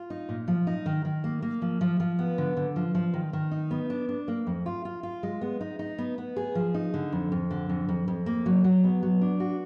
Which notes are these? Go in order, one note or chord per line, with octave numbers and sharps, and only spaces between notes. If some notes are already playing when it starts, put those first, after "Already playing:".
Already playing: F4
D#4
A#2
F3
D#4
D#3
D#3
A#3
A#3
F3
F3
F3
B3
D3
D3
F3
F3
D#3
D#3
D#4
B3
D4
D4
A#3
F2
F4
F4
F4
G#3
B3
D#4
D#4
B3
B3
G#4
F3
D#4
D3
F2
F2
D3
F2
F2
F2
A#3
F#3
F#3
B3
F#3
D4
F#4